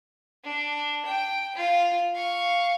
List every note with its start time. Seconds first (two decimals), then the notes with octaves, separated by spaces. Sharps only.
0.44 D4
1.05 G5
1.55 F4
2.15 F5 C#6